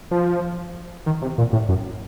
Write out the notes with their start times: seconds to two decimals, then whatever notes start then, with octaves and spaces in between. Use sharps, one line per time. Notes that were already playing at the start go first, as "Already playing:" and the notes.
0.11 F3
1.06 D#3
1.22 C3
1.38 A#2
1.53 A2
1.69 F#2